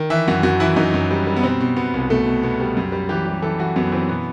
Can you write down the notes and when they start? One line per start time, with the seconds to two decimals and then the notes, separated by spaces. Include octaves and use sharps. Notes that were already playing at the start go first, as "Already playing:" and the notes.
Already playing: D#3
0.10 E3 E5
0.28 F#2 F#4
0.43 F#2 F#4
0.60 E3 E4
0.76 F#2 D#4
0.94 F#2
1.11 G3
1.27 G3
1.36 B3
1.43 B2 C4
1.61 B2
1.76 B2 B3
1.94 C2
2.10 B2 A3
2.26 B2
2.43 B2 B3
2.60 G3
2.77 F#2
2.92 G3
3.09 E3 G4
3.26 G3
3.42 E3 A4
3.59 E3 F#4
3.76 F#2 B3
3.92 E3 C4
4.09 B2 B3